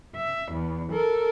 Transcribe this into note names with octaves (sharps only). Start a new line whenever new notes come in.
E5
E2
A4 A#4